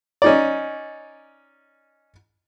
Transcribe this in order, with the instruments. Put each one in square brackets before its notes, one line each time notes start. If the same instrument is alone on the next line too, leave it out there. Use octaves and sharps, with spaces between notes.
[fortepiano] C#4 D#4 D5